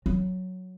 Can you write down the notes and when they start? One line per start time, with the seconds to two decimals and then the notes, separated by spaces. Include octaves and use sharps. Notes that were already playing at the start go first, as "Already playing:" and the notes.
0.06 F#3